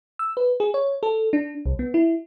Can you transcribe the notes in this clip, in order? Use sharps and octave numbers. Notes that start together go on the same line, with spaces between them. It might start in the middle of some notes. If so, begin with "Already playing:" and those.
E6
B4
G#4
C#5
A4
D4
C2
B3
E4